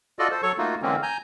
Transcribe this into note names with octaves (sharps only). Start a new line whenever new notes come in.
F4 F#4 A4 D5 D#5
A4 C5
F#3 A4 C#5 C#6
A3 A#3 D#4 F4 F#4
D3 E3 G#3 A#3 C4 C#4
G#5 A#5 G6